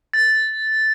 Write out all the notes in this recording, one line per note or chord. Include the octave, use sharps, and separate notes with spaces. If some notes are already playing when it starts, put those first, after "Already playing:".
A6